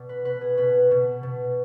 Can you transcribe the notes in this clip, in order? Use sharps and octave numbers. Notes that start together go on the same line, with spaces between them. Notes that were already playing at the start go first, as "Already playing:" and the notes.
Already playing: B2 D5
B4
B2 B4
G#4
B2 B4
B2
B2